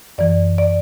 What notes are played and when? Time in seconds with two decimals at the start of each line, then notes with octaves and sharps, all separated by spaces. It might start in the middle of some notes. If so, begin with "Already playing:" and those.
0.18 F#2 E3 D5
0.58 D5